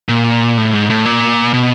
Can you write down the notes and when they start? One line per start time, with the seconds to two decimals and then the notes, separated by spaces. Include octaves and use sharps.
0.09 A#2
0.58 A2
0.73 G#2
0.90 A2
1.05 A#2
1.53 B2